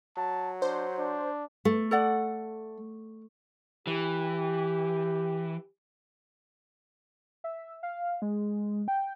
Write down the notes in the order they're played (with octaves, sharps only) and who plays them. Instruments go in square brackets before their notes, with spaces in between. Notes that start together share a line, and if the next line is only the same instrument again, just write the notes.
[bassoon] F#3 [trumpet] A5
[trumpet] D4 [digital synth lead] C5
[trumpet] D4
[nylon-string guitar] A3
[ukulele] A4 D5 F#5
[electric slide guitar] E3 [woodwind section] G4
[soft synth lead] E5
F5
G#3
G5